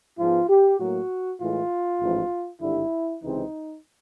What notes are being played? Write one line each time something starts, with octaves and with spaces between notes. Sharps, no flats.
G#2 F3 G#3 B3 F4
G4
A2 F#3 A#3 F#4
A2 E3 G#3 F4
A1 G#2 F3
G#1 G2 D3 G3 E4
C#2 C3 E3 G#3 C4 D#4